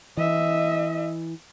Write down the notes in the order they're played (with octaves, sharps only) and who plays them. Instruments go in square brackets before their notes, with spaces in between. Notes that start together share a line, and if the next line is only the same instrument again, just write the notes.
[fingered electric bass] E3 [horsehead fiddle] D#5 E5